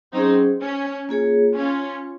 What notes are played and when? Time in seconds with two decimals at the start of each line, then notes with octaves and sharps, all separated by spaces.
0.13 F#3 C4 C#4 D#4 G#4
0.61 C#4
1.09 A#3 F4 G#4 C#5
1.56 C#4 F4